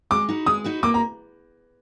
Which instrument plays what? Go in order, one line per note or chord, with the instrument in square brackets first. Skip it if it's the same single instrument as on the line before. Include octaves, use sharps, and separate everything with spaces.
[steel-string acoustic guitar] G#3 [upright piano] D6
[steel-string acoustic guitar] D#4 F#4 B4
[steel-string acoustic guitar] G#3 [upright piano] D#6
[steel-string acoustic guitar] D#4 F#4 B4
[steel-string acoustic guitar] A#3 [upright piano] D6
[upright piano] A#5